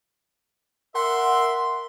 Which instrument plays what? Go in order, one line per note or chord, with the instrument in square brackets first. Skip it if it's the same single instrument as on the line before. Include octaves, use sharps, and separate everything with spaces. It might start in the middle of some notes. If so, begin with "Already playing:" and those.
[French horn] A#4 [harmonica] E5 C6 [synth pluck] F#5